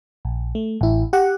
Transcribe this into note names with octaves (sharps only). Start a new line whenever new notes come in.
A#1
A3
A1 E4
G4 F#5